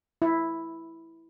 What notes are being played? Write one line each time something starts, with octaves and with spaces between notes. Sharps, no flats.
E4